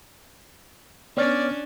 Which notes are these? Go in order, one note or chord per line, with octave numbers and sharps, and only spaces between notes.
B3 C#4 D4 C#5 D5 F6